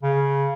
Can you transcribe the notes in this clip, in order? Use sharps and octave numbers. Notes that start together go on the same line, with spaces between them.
C#3